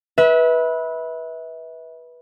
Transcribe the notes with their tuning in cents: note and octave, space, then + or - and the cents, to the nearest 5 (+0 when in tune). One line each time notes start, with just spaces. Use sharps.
B4 -15 E5 -30